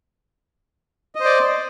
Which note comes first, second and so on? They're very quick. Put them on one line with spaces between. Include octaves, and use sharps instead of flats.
D#5 C5 D5